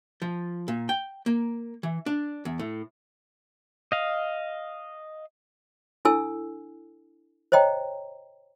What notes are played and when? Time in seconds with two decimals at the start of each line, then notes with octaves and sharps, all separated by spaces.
0.22 F3
0.68 A#2
0.89 G5
1.26 A#3
1.83 E3
2.06 D4
2.45 E2
2.59 A2
3.92 D#5 F5
6.05 D4 E4 A4 G#5 E6
7.52 C5 C#5 D#5 G5 A#5